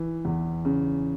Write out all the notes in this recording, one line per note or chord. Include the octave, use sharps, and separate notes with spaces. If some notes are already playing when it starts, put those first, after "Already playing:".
Already playing: E3
E2
C#3